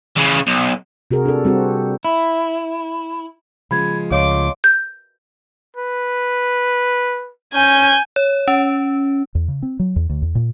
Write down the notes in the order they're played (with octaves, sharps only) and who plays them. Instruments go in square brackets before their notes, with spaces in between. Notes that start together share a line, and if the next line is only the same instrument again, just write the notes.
[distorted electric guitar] C#3 E3
B1
[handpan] C3 F#4 G#4 A#4
D4 A4
G3 C4 F#4 G#4
[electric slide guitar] E4
[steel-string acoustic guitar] C#3 F3 G#3 [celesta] B5 G#6
[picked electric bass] C#2 [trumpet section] A3 C6 D6 [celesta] C#5 D#5 F5
[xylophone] G6
[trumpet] B4
[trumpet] C#4 [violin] G#5 G6
[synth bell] C#5
C#4
[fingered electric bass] E2
C#3
C4
F#3
E2
D2
E2
A#2